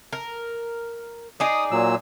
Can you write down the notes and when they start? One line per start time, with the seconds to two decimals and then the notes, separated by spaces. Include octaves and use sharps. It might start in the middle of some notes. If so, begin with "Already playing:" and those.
0.13 A#4
1.40 D#4 G#4 D5 D#6
1.71 A#2 F#3 E6